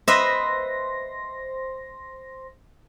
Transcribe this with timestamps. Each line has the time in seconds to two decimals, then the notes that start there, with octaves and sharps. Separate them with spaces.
0.08 B4 C5 D#5 E5 C6 A#6